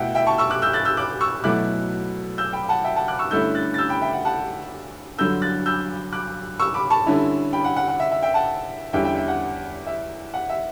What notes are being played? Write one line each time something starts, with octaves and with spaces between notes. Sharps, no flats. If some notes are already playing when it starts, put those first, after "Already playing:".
Already playing: B2 A3 E4 E5 F#5 G5
E5 G5
A5 C#6
C#6 E6
D6 F#6
E6 G6
F#6 A6
E6 G6
D6 F#6
C#6 E6
B2 F#3 A3 E4 D6 F#6
E6 G6
G5 B5
F#5 A5
E5 G5
F#5 A5
D6 F#6
C#6 E6
G2 D3 A3 C#4 E4 E6 G6
F#6 A6
A6
E6 G6
G5 B5
E5 G5
F#5
F#5 A5
G2 D3 F#3 E6 G6
F#6 A6
E6 G6
D6 F#6
C#6 E6
B5 D6
A5 C#6
D3 G3 C#4 E4
G5 B5
F#5
F#5
F#5
E5
E5
E5 G5
F#5 A5
E2 D3 G3 C#4 E5 G5
E5 G5
E5
F#5
E5
F#5
E5